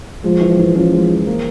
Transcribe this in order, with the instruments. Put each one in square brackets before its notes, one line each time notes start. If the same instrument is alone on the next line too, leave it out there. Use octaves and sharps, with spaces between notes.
[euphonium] F3 [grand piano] G#3
[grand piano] E3
E3
[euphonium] F3 [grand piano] C#4
[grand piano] G#3
E3
A#3